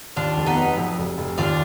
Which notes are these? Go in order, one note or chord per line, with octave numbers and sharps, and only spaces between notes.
D#2 D4 F4
F1
B3 D#4
F#3
F2
F1
F1
D#2 D4 F4